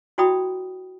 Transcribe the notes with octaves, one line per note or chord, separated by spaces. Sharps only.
E4 F#4 D5 G5 B5 D#6